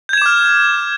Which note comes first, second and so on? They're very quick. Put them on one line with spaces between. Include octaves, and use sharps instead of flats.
G6 G#6 E7 D6 F6